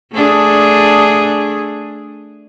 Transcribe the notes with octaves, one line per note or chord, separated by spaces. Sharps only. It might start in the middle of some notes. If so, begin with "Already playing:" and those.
A3 D4 G#4